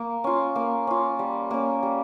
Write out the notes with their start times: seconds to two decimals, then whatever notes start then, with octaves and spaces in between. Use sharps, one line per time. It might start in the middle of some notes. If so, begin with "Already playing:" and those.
Already playing: A#3
0.24 C#4 F4
0.56 A#3
0.87 C#4 F4
1.19 G3
1.51 A#3 C#4
1.83 G3